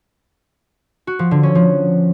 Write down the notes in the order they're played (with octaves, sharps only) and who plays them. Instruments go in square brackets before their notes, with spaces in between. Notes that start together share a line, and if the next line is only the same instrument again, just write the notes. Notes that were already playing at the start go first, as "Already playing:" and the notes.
[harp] F#4
F3
D3
C#4
F3